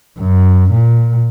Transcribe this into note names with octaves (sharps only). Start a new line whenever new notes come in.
F#2
A#2